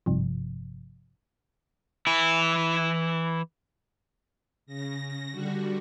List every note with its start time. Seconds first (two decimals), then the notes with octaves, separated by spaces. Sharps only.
0.06 G#1 G2 C3 F3
2.07 E3 E4
4.66 C#3 A#6
5.31 D3 G3 F#4